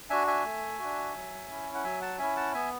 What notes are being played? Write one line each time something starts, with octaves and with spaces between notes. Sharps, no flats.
D4 F#4 E5 G#5
E5 G#5
A3
D4 F#4
F#3
C#4 E4
F#5
F#3 E5 G#5
F#5 A5
C#4 E4 E5 G#5
F#5 A5
B3 E5 G#5